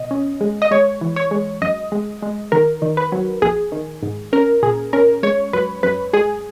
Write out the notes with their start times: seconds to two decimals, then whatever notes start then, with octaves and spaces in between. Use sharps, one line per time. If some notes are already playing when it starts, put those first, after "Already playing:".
Already playing: B2 D#5
0.11 C#4
0.41 G#3
0.62 D#5
0.71 G#3 C#5
1.01 E3
1.16 C#5
1.31 G#3
1.62 F#2 D#5
1.92 G#3
2.22 G#3
2.52 D#3 A#4
2.82 D#3
2.97 B4
3.12 F#3
3.42 A#1 G#4
3.72 D#3
4.03 G#2
4.33 C#4 A#4
4.63 A#2 G#4
4.93 C#4 A#4
5.23 G#3 C#5
5.53 F#2 B4
5.83 F#2 B4
6.13 G#3 G#4